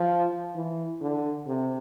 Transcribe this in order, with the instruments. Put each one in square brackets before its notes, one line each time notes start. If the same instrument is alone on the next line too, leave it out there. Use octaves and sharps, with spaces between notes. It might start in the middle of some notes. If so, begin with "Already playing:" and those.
Already playing: [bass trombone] F3
E3
D3
C3